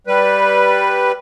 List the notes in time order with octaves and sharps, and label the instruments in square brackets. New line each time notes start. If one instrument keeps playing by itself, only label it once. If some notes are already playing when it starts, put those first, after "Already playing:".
[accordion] G3 B4